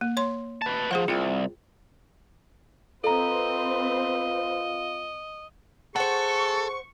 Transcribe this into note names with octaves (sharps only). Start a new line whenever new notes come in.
A#3
C#5 C6
B4 A5
F3 G#4 C5 F#5
C2 F4 G5
C4 F4 A4 B4 C5 D#5 A#5
G#4 A4 C5 F#5 C#6